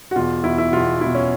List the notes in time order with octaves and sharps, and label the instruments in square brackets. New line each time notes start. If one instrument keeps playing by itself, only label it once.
[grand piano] F#4
E2 B2 F4
E2 B2 E4
E4
E2 B2 F4
E2 B2 E4
C#4